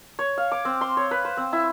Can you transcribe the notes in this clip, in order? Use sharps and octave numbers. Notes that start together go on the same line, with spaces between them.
C#5
F5
D6
C4
C6
C#5
B4
C5
C4
E4